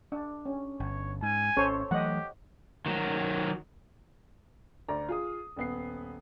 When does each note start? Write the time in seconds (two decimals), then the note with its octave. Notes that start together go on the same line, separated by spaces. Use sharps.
0.12 D4
0.46 C#4
0.80 G1 C#5
1.23 G#2 G#5
1.57 G#1 C#4 A4 C5 C#5
1.91 E3 F#3 A3 G4 D#5 F#5
2.86 D#3 F#3
4.88 D2 D5 A#5
5.09 F4 G#4 D#6
5.56 D#1 B3 C7